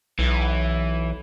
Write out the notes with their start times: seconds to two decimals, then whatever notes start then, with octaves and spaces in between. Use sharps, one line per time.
0.19 B1 E3